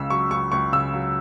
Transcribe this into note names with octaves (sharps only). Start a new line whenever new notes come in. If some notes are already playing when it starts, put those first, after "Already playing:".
Already playing: C#2 C#3 E6
F#3 C#6
C#2 C#6
C#2 C#6
C#3 E6
F#3